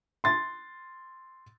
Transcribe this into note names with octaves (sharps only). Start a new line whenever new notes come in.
C6 A6